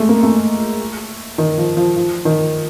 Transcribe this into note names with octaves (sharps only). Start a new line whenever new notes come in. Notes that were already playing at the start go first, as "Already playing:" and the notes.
Already playing: G#3 A3
A#3
A3
D#3
F3
F3
F3
D#3